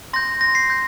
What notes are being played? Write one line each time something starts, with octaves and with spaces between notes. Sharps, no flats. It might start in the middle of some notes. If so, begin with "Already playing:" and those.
C6 G6 A#6
A#6
C7
G6